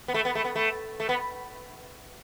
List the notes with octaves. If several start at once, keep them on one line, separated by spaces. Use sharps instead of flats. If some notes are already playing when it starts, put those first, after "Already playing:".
B3
A3
B3
A3
B3
A3
A3
B3